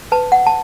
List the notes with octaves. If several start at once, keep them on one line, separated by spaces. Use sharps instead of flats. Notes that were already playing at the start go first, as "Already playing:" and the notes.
B4 A5
F#5
A5